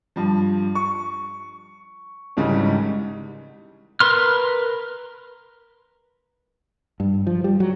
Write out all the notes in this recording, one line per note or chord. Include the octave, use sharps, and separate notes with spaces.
G2 F3
C#6
G#1 G#2 C#3 E3 G3
A#4 B4 C6 F6
G2
F3
G3
F#3